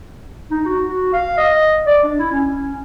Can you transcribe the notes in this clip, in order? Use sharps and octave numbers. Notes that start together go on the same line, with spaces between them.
D#4
F#4
F#4
F5
D#5
D5
D4
E4
C#4